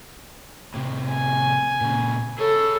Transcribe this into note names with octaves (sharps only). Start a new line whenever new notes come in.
A2 C3
G#5
A#2 C#3
G#4 A4 C#5